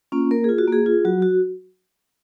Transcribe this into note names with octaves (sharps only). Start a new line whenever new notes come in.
A#3 C#4 F4
A#3 A#4
F4 G#4
F#4
A#3 G#4
F4
F#3 F#4
F#4